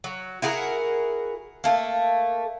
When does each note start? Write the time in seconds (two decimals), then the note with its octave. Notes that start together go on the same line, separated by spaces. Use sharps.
0.04 F#3
0.42 E4 F#4 G#4 A#4
1.64 A3 A#3